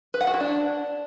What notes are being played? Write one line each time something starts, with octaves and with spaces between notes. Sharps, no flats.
B4
F#5
F#4
E4
D4